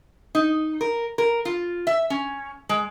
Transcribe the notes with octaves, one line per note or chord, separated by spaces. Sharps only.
D#4
A#4
A#4
F4
E5
C#4
G#3